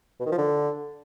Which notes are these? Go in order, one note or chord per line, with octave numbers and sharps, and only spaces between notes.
B2
D#3
F3
D3